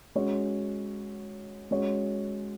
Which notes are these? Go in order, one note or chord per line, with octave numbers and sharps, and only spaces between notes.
G#3 C#4 F#4 C#5
G#3 C#4 F#4 C#5